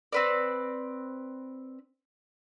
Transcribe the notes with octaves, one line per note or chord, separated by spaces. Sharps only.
C4 B4 D5